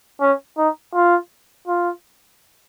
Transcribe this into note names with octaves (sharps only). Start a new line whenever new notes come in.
C#4
D#4
F4
F4